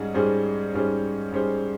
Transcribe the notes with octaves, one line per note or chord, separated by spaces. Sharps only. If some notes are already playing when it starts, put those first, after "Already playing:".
Already playing: G#2 G3 C#4 G#4
G#2 G3 C#4 G#4 C5
G#2 G3 C#4 G#4 C5
G#2 G3 C#4 G#4 C5